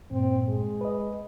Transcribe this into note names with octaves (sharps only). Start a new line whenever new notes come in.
G2 A#2 C4
G#3
B4 D#5